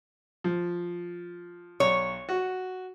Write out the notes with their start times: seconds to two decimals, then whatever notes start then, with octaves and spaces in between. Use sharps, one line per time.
0.44 F3
1.80 B1 C#5
2.29 F#4